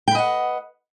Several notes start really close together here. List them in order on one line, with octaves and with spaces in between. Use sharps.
G5 B4 D#5 F#5